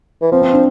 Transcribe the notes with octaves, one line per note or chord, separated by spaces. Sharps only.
E3
F3 C4
C4
D4